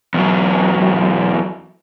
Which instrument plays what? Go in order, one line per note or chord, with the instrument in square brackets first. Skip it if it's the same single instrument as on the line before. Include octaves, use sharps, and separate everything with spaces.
[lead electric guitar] E2 F#3